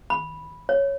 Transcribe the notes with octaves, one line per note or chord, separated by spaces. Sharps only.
B5
C#5